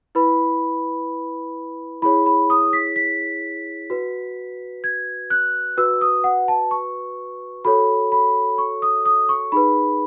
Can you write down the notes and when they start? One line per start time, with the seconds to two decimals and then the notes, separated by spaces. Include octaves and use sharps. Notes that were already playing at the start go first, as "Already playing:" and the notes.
0.15 E4 B4 B5
2.02 E4 G#4 C#5 B5
2.26 B5
2.50 D#6
2.73 B6
2.96 B6
3.90 F#4 B4
4.84 G#6
5.30 F#6
5.77 F#4 B4 E6
6.01 D#6
6.24 F#5
6.48 A5
6.71 C#6
7.65 F#4 A4 C#5 B5
8.12 B5
8.58 C#6
8.82 D#6
9.06 D#6
9.29 C#6
9.52 D#4 G#4 B4 B5